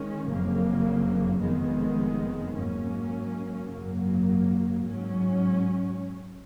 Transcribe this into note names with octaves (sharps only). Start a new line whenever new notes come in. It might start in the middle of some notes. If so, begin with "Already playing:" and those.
Already playing: D#3 G#3 C#4
F#1 F2 C#3 F#3 A#3
F1 F2 D#3 G#3 B3
G#2 F#3 A#3 C#4
G#1 F#2 C#3 F#3 A#3
G#2 F#3 C#4